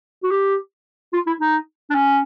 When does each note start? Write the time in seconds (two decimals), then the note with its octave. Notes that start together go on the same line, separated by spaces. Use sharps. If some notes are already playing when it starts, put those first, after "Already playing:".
0.23 F#4
0.31 G4
1.13 F4
1.27 E4
1.40 D#4
1.90 D4
1.95 C#4